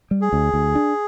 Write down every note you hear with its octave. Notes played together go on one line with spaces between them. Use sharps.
G3
G#4
D2
D2
D4